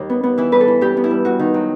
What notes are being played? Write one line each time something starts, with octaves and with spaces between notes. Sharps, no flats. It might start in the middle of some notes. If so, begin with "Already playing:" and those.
Already playing: D#2 G3 D#4
B3
B3
E3 E4
G2 B4
A4
E3
G2 G4
B3
E4
G3
G2 F#4
D#3
F#3